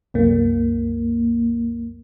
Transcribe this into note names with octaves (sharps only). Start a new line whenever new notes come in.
C2 F#2 A#3